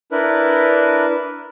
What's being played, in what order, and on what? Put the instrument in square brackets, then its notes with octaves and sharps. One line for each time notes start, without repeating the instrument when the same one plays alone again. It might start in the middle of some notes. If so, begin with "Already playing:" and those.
[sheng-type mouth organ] D4 E4 A#4 B4